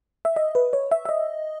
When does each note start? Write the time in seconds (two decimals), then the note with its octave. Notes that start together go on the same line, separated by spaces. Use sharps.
0.25 E5
0.36 D#5
0.55 B4
0.73 C#5
0.91 E5
1.05 E5
1.09 D#5